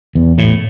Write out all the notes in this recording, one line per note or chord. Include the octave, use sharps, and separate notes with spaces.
E2
A2